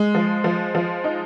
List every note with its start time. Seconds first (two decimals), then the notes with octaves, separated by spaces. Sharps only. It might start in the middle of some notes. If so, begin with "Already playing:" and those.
Already playing: G#3
0.15 F3
0.44 F3
0.75 F3
1.04 D#4